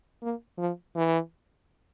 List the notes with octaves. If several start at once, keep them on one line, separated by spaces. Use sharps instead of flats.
A#3
F3
E3